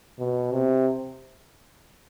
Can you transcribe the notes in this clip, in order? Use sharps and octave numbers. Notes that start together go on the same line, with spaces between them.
B2
C3